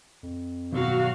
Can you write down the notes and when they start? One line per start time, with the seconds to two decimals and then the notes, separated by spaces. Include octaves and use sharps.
0.23 F2
0.72 G2 B2 D#3 F#3 F#4 F5